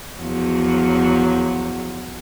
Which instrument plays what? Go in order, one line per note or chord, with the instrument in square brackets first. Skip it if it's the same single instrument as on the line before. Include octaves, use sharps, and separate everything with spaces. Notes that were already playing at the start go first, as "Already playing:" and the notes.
[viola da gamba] E2 F3 F#3